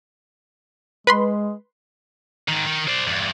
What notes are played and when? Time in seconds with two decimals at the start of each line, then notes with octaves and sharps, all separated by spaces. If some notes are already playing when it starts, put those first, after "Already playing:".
1.07 G#3 B4 B5 C6
2.49 G#2 D#3
2.67 D#3
2.88 C5 D5
3.07 E2 G2